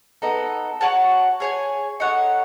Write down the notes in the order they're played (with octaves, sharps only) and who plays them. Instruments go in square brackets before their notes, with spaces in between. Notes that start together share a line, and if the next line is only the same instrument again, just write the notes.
[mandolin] B3 D#4 A4
F#4 C#5 F#5 A5
G#4 C#5 G#5
D#4 A4 C#5 F#5